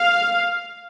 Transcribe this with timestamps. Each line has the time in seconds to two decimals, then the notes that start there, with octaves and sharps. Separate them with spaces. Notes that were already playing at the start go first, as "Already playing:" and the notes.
Already playing: F5